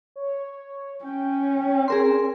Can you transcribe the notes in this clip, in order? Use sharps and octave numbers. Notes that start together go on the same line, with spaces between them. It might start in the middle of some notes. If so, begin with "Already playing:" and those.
C#5
C#4 G5
G#4 A#4 C6